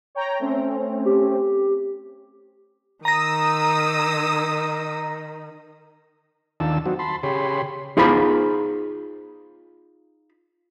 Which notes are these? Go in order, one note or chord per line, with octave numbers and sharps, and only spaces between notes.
C#5 G5 A#5
A3 C4 C#4
G4
D#3 A#5 D#6 E6 A#6
D#2 D#3 D4 F4 A5 E6
F#3 C4 D#4 F#4
A5 B5 C6
C#3 G4 G#4 C#5 B5 C6
D#4 F4 G#4 C5 B5